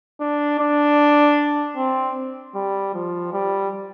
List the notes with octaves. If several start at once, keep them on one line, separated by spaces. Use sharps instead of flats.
D4
D4
C4
G3
F3
G3